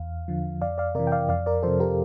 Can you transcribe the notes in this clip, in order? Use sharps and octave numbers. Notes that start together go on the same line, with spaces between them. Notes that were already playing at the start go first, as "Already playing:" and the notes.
Already playing: E2 F5
D3 F3
F2 D5 F5
D5 F5
C3 E3 A#4 D5
G5
D5 F5
F2 D5 F5
A#4 D5
C3 F3 A4 C5
G4 A#4